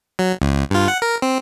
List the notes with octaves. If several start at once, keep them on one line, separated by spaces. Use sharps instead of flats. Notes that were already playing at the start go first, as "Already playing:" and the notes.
F#3
C#2
G2 F4
F#5
A#4
C4